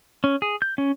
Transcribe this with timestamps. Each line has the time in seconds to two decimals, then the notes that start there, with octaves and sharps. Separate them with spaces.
0.24 C#4
0.42 G#4
0.62 G6
0.78 C#4